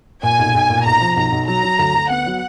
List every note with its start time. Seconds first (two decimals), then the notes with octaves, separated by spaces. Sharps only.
0.23 A#2 G#5
0.39 B1
0.55 B1
0.70 A#2
0.85 B1 A#5
1.00 F3
1.16 B1 A#5
1.32 B1
1.48 F#3 A#5
1.63 F#3
1.79 D2
1.95 D2
2.10 B3 F#5
2.26 F#3